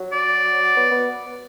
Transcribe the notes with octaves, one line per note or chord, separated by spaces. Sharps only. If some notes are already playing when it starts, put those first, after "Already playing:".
Already playing: F#3
D5
B3
B3